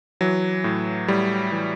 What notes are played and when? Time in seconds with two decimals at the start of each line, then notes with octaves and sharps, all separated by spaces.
0.21 E3 F#3
0.64 A2
1.08 A2 G3
1.52 E3